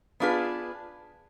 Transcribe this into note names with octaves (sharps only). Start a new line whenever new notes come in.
B3 D4 F4 G#4 B4